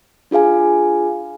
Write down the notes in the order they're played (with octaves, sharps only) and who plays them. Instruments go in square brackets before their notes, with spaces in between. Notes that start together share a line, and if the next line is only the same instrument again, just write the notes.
[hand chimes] D4 F4 G#4 F5 G#5